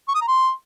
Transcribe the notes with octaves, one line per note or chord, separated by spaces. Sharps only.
C#6
D#6
A#5
C6